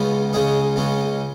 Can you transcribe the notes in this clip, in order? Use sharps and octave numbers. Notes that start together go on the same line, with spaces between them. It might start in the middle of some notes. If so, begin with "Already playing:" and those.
Already playing: C#2 C#3 G#3 B3
C#2 C#3 G#3 C#4 G#4
C#2 C#3 G#3 C#4